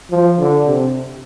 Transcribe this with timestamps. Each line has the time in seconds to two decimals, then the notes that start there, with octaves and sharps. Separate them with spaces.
0.11 F3
0.40 D3
0.67 C3